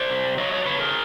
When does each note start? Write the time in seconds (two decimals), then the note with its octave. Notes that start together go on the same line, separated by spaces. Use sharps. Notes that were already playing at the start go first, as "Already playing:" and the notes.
Already playing: C5 D5
0.10 C3
0.37 F#3 C#5 D#5
0.51 C#5 D#5
0.61 D5
0.65 C#3 B4 C#5
0.79 G#4 A#4